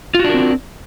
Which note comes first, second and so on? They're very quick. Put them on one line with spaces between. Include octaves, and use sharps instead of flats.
F4 F#4 D4 A#4 C4